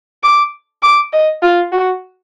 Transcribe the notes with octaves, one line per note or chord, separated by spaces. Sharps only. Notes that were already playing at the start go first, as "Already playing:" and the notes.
D6
D6
D#5
F4
F#4